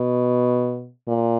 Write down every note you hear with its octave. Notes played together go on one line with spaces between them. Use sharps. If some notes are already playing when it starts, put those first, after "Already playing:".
Already playing: B2
A#2